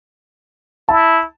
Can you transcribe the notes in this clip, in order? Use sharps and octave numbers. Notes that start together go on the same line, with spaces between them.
E4 A5